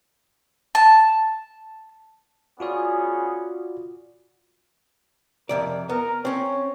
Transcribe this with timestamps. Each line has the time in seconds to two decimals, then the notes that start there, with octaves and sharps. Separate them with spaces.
0.75 A5
2.60 B3 C#4 F4 F#4 G#4 D5
5.49 F2 C3 A#4 D5
5.90 B3 A#4
6.25 C4 C#4 C#5